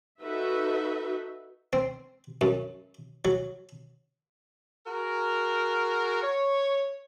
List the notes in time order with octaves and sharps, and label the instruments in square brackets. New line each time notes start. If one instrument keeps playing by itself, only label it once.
[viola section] D#4 F#4 A4 B4 E5
[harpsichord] C4
F#2
F#3
[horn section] F#4 G#4 A#4
C#5